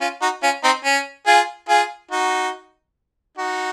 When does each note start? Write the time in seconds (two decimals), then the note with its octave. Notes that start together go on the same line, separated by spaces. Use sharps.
0.01 C#4 F4
0.22 D#4 F#4
0.42 C#4 F4
0.64 C4 D#4
0.84 C#4
1.27 F4 G#4
1.69 F4 G#4
2.11 D#4 F#4
3.37 D#4 F#4